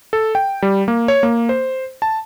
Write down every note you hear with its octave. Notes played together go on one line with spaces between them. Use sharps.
A4
G5
G3
A#3
C#5
A#3
C5
A5